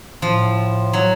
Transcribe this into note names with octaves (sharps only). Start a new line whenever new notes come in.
A2 F3
F#3